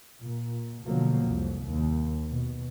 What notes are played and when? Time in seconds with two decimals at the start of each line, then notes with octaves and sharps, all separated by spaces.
0.21 A#2
0.83 B2 D3 F3 F#3 A#3
1.24 C2 F2
1.64 D#2
2.26 B2